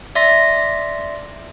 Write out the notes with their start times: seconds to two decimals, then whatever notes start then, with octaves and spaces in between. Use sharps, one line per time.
0.15 D5 E5 C6 A#6